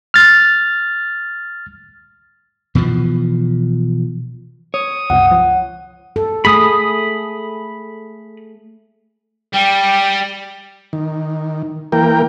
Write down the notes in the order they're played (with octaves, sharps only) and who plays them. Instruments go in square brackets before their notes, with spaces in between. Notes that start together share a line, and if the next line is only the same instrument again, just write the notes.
[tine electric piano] F6 A6
[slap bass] B2 E3 F3
[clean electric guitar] C#5 [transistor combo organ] D#6
[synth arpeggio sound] C#2 G2 C3 [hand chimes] F#5
[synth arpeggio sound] F3
[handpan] A4
[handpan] A3 G#4 [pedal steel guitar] B5 D#6
[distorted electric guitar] G3 [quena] G5
[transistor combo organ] D#3
E3 A#3 A#4 G5